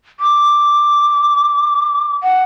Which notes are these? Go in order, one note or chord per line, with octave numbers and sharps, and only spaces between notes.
D6
F#5